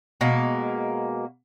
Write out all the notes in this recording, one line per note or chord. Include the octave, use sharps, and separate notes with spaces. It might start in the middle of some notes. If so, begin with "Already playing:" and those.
B2 G#3 A#3